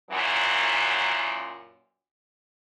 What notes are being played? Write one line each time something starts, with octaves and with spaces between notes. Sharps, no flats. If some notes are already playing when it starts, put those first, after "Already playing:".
F#2 A#2 E3 F#3